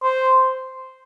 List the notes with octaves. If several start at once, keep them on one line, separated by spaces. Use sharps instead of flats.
C5